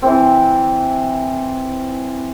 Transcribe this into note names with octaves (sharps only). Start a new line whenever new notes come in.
E3 C4